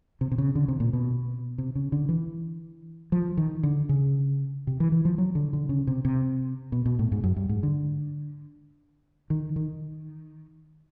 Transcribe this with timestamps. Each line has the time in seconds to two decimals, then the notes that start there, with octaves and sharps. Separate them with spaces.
0.21 C3
0.32 C3
0.38 C#3
0.55 D3
0.68 C3
0.80 A#2
0.93 B2
1.58 C3
1.75 C#3
1.92 D3
2.09 E3
3.12 F3
3.37 D#3
3.63 D3
3.89 C#3
4.67 C3
4.80 E3
4.92 E3
5.05 F3
5.18 F#3
5.35 D3
5.53 D3
5.69 C#3
5.87 C3
6.05 C3
6.72 B2
6.86 B2
6.99 A2
7.12 G#2
7.24 F#2
7.36 G2
7.49 G#2
7.63 D3
9.30 D#3
9.56 D#3